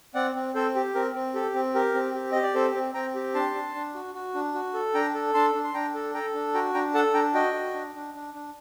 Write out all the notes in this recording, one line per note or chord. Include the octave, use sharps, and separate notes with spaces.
C4 D5 F#5
C4
C4 A4 C5
G4
C4 A#4
C4
G4 A4
C4
G4 A#4
C4
G4
G4 D#5
D5
C4 A4 C5
C4
C4 G5 A#5
G4
D4 A5 C6
D4
D4
F#4
F#4
D4
F#4
A4
D4 G5 A#5
A4
D4 A5 C6
D4
C6
D4 G5 A#5
A4
A4 G5 A#5
D4
F#4 G5 A#5
D4 G5 A#5
A4 F#5 A5
D4 G5 A#5
F#4 D#5 G5
F#4
D4
D4
D4
D4